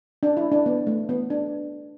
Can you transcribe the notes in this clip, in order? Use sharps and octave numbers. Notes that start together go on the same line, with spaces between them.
D4
E4
D4
B3
A3
B3
D4